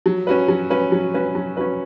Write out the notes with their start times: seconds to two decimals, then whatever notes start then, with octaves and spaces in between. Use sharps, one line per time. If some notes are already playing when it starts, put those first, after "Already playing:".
0.06 F#3
0.27 C#4 F#4 B4
0.48 F#3
0.70 C#4 F#4 B4
0.92 F#3
1.14 C#4 F#4 B4
1.35 F#3
1.57 C#4 F#4 B4